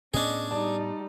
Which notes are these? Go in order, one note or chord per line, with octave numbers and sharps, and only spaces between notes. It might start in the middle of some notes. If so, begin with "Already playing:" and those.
A2 B3 C#4 D4 G#4 D#5
G3 D#4 D5 A5